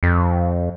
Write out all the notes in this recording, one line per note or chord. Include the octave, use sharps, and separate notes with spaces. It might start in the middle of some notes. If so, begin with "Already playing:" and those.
F2